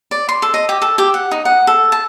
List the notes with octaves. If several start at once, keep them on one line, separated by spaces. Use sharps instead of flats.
D5
C6
A4
D#5
G4
A4
G4
F#5
D#4
F#5
A4
A5